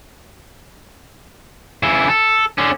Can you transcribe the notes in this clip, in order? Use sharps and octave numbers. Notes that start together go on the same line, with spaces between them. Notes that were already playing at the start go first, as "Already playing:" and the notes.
C#3 E4
A4
D3 C#4